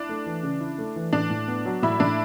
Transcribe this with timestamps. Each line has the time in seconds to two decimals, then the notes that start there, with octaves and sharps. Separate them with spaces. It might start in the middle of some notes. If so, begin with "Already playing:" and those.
Already playing: D4 E4
0.09 A3
0.26 E3
0.43 C#3
0.60 E4
0.78 A3
0.96 E3
1.13 A2 D4
1.30 A2
1.48 B3
1.66 F#3
1.83 A2 E4
2.00 A2 D4